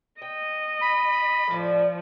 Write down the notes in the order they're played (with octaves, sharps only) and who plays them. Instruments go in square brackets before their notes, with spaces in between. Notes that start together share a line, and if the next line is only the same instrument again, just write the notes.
[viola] D#5 [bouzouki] G5
[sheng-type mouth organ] B5
[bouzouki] A2 D5 D#5 [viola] F3